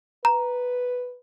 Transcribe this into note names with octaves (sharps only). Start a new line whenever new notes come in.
B4 A#5